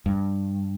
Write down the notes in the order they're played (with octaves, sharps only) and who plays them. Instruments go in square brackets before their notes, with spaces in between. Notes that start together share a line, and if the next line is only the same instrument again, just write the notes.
[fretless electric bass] G2